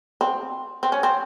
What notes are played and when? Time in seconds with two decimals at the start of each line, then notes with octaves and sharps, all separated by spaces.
0.21 C4
0.83 C4
0.92 C#4
1.03 C4